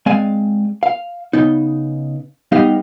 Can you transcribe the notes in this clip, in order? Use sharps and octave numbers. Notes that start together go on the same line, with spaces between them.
G#3 C4 D5 F5 G#5
F5
C#3 B3 D#4
G3 B3 D#4 G4 D#5 F5